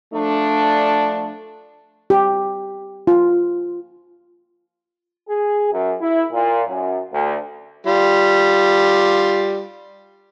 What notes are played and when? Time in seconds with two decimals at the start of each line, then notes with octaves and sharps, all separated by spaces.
0.14 F3 A3 D4
2.10 G4
3.07 F4
5.29 G#4
5.72 F#2
6.01 E4
6.33 A#2
6.68 F#2
7.13 D2
7.87 G3 F4